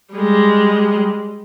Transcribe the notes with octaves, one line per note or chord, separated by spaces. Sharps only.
G3 G#3